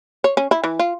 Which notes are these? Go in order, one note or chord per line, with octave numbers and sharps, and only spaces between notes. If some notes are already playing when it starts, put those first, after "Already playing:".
C#5
C#4
E4
E3
F4